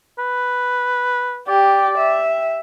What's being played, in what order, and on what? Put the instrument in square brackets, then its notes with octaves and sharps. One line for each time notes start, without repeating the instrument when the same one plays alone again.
[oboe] B4
[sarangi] G4 [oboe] D5
[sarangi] E5